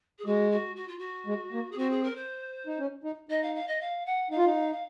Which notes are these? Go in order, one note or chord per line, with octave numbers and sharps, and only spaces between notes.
G#4
G#3 F#4
F#4
F#4
F4
F#4
G#3
A#3
G#4
C4 F#4
G#4
A#4
C5
D#4
C#4
D#4
D#4 D#5
F5
F5
D#5
F5
F#5
D#4 F5
F4
D#4
F5